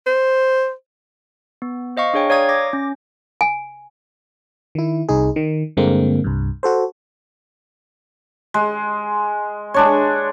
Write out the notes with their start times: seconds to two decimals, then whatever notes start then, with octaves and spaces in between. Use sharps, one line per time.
0.06 C5
1.62 B3
1.97 C5 D#5 F5 C#6
2.14 D4 G#4 C#5 G5
2.30 C#5 D5 F5 A#5 D#6 G#6
2.49 D6 A#6
2.73 C#4
3.41 G#5
4.75 D#3 E4
5.09 C2 D#4 G#4
5.36 D#3
5.77 G2 D3 G#3 A#3 C4
6.24 C2 G2
6.63 F#4 A4 C5
8.54 G#3
9.74 G#3 D4 C#5